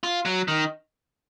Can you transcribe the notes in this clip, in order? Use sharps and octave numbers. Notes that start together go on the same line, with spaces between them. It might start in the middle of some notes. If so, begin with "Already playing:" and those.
F4
F#3
D#3